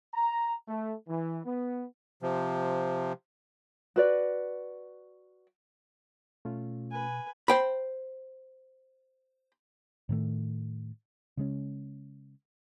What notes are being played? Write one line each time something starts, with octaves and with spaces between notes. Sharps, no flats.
A#5
A3
E3
B3
C3 F3
F#4 B4 D5
B2 A3 C#4 F4
B4 G#5
C5 G5 B5
A2 D#3 A3
C#3 G#3 C#4